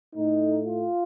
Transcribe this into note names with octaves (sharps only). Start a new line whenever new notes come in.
A2 A3 D#4
F4